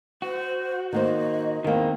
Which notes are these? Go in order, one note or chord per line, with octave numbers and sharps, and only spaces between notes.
F#4 C5
D#3 A#3 C5 D#5
E2 D#3 A#3 C4